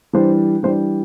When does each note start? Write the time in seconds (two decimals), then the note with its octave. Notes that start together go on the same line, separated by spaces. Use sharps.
0.13 E3 G3 D4 C5
0.63 E3 G3 D4 C5